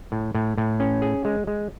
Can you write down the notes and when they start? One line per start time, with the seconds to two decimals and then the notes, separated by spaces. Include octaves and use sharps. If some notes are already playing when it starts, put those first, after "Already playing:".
0.12 A2
0.35 A2
0.58 A2
0.80 C#4
1.02 G#4
1.25 G#3
1.47 G#3